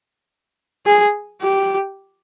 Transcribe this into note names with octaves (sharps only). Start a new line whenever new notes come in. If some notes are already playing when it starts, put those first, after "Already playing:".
G#4
G4